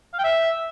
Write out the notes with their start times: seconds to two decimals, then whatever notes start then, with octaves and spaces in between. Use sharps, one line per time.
0.14 F5
0.19 G5
0.24 E5